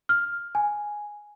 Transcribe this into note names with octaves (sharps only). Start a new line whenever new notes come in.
F6
G#5